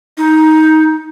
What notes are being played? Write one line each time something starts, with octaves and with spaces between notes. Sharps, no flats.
D#4